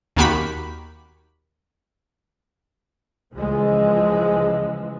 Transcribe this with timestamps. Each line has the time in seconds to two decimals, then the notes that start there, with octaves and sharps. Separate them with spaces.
0.16 D#2 D#3 A#3 F#4 G4 B5
3.32 C#2 E3 F3 G#3